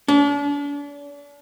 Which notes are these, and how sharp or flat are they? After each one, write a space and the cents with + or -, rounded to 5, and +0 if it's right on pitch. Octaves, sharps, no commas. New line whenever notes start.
D4 -40